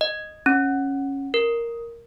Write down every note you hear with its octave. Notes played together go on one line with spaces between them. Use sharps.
D#5
C#4
A#4